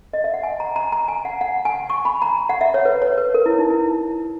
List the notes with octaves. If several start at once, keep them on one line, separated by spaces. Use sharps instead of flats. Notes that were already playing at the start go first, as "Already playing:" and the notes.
D#5
E5
F#5
G#5
A#5
A#5
A#5
G#5
F#5
F#5
G#5
C#6
B5
A#5
F#5
E5
C#5
B4
C#5
B4
A#4
E4
D#4
E4